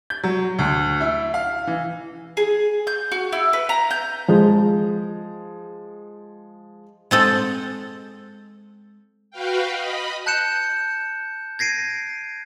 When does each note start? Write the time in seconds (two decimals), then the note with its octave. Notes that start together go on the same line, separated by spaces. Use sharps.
0.10 G6
0.24 F#3
0.59 D2
1.00 E4
1.34 F5
1.67 E3
2.37 G#4
2.87 G6
3.12 F#4
3.32 E4
3.53 B4
3.69 A#5
3.91 G6
4.28 F3 G#3
7.11 G#3 C4 A4
9.31 F#4 B4 F5 G5
9.72 D#5 B5
10.26 A5 F#6 G6 C#7 E7
11.59 G#6 A#6 C7 D7 D#7